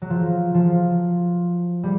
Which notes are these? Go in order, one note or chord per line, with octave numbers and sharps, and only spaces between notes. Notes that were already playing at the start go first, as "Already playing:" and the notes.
F#3
F3
F3
G3